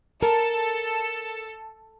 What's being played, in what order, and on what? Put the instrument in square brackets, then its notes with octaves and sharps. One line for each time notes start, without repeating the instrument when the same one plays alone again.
[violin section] A4 [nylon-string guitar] A#4